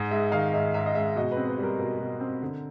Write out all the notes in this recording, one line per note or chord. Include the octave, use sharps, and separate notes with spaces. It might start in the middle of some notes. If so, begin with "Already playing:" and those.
Already playing: G#2 D#5
G#3 E5
D#3 F5
G#2 E5
G#2 E5
D#5
G#3 E5
B2 D#5
B4
C4
B4
G3 A#4
B2 A#4
B2
C4
D3